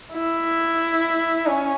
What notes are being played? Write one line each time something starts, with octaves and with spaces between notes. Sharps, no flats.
E4
C#4